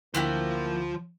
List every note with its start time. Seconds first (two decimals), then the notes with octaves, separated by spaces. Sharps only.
0.15 D2 F3 A#3 D4 E4 F#4 G4 C5